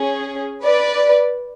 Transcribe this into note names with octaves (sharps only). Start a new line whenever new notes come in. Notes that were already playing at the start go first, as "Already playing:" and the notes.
Already playing: C#4 G#4
B4 D5